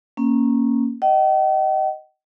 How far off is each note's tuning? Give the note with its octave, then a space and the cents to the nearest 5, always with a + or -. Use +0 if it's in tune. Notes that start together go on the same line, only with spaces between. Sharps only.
A#3 +0 C#4 -10
D#5 +0 G5 -45